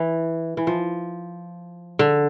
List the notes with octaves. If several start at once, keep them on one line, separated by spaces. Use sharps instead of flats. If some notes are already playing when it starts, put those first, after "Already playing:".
Already playing: E3
E3
F3
D3